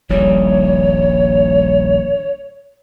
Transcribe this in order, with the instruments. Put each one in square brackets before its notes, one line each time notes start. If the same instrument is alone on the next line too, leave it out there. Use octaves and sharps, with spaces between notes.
[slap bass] D#1 A#1 G3 [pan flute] C#5